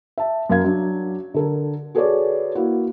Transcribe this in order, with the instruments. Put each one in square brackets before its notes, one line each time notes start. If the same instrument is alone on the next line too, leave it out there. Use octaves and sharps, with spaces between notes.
[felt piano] E5 A5
F#2 A#4 F5 G#6
F#3 D4
D3 A4 A#4
F#4 G#4 A4 B4 C#5 D5
A#3 E4 F#4